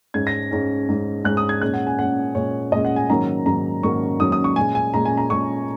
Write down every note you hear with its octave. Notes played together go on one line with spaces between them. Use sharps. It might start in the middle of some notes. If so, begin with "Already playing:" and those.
G#2 G#3 C#4 G#6
A#6
G#2 G#3 C#4
G#2 G#3 C#4
G#2 G#3 C#4 F#6
D#6
G#6
A#2 G#3 C#4 F#6
F#5
G#5
A#2 G#3 C#4 F#5
A#2 G#3 C#4 C#5
A#2 G#3 C#4 D#5
F#5
G#5
G#2 D#3 F#3 A#3 C#4 A#5
G#2 D#3 F#3 A#3 C#4 A#5
G#2 D#3 F#3 A#3 C#4 C#6
G#2 D#3 F#3 A#3 C#4 D#6
D#6
C#6
A#2 G#3 C#4 G#5
G#5
A#2 G#3 C#4 A#5
G#5
A#5
A#2 G#3 C#4 C#6